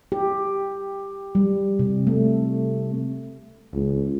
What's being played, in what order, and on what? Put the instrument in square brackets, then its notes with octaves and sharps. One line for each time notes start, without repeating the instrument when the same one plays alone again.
[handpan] G4
G3
C3
A3
[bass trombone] C#2